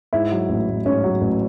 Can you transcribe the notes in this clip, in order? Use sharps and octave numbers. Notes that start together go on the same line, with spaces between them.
G#2 E4
F#3
A1
A1
G#2 C#4
F#3
A1